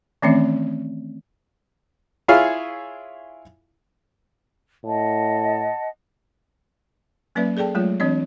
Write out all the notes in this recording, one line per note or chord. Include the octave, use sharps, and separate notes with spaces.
D#3 E3 A3 C4 C#4 E5
E4 F4 G#4 C#5 F5 G#5
A2 D#5 F#5 A5
F#3 A#3 C#4 B4 D5 E5
G#4 A4 D5 G5 A5
F#3 G#3 A3 F4 C#5
E3 C4 D4 C#5 D#5